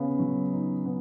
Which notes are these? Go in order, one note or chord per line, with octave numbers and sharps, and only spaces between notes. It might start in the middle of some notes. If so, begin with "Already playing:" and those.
Already playing: C#3 B3
F#3
D#4
B3